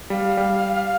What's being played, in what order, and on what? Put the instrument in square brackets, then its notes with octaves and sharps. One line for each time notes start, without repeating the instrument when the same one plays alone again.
[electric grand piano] G3 [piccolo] F5
[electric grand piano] G3